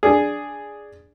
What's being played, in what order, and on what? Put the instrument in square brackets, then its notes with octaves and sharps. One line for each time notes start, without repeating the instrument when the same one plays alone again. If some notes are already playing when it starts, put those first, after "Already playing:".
[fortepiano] D4 G#4